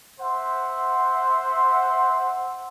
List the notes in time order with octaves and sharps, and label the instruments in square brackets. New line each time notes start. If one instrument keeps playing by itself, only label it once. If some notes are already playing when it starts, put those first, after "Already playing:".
[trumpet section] C5 E5 F#5 C6